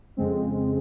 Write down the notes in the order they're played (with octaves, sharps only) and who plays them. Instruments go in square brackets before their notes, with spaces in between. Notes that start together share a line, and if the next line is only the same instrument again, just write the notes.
[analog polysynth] F2 C#3 G#3 C4